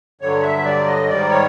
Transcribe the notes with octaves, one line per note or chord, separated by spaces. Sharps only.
G2 D3 F#3 C#5
E5
D5
D#5
G#2 D#3 G3 D5
C#5